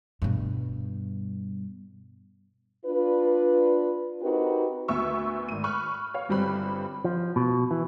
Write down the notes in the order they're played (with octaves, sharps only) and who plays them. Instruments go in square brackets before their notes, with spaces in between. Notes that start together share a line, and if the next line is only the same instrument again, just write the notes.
[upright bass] G2 B2
[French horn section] D4 F4 B4
C4 D#4 F#4 G4 A#4 B4
[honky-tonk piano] D2 B3 E5 C#6 E6
G#1 D#7
B5 C#6 F6 F#6
C#5 F5
G1 G2 G3 C4 B5 F#6
[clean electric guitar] F3
B2
E3